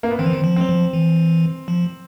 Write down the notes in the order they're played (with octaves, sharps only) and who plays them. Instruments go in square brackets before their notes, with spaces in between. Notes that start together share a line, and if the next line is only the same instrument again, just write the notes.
[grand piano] A#3
B3
[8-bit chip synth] D#3 [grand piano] C4
[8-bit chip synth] E3
D#3
F3
[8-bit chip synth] F#3 [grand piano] C4
[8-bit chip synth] F3
E3
F3